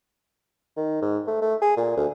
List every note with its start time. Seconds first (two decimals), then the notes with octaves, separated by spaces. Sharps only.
0.77 D#3
1.02 G#2
1.27 A3
1.42 A3
1.62 G#4
1.77 A#2
1.97 D2